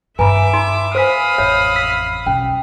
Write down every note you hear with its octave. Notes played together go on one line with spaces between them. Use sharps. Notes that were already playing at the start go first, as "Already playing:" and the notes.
G2 E4 B4 E5 G#5 A#5 B5 D6
D#4 B5 C6
B4 C5 F5 G#5 B5 D#6 F6 B6
A1 F2 C#5 E5
E6 B6
B1 C#4 G5